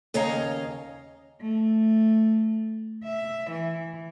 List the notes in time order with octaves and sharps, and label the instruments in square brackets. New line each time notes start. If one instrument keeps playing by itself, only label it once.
[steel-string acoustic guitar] D#2 C#3 C#5 D#5 F5 A#5
[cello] A3
E5
E3